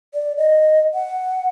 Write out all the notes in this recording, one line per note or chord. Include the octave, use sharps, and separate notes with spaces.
D5
D#5
F#5